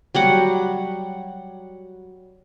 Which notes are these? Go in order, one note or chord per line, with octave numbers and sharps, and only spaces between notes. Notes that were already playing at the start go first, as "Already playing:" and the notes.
F#3 G3 F#5